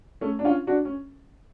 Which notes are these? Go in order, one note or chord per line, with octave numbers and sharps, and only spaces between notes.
A3 C#4
D4
C#4 F4
D4 F#4
C#4